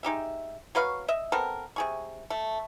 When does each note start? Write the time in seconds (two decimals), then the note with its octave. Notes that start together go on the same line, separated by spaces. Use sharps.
0.03 G#3 D#4 G4 E5
0.75 F#3 B4 F5 C#6
1.08 D#5 E5
1.32 B3 C4 A4 A#4
1.76 C3 G#4 C#6
2.30 A3